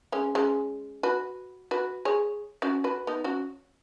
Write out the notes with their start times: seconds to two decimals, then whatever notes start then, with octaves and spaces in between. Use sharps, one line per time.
0.12 G#3 C#4
0.35 G#3 C#4
1.03 F#4 B4
1.71 F#4 B4
2.05 G#4 C#5
2.62 C#4 F#4
2.84 F#4 B4
3.07 B3 D#4
3.24 C#4 F#4